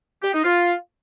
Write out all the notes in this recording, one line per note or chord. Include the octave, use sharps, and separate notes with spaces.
G4
D#4
F4